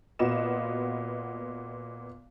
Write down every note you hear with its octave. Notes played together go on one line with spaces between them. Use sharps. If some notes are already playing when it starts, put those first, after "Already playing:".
A#2 B3 F4 F#4 D#5 E7